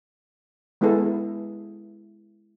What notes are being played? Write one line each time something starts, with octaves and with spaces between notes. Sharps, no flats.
G#3 B3 E4 G#4 A4 B4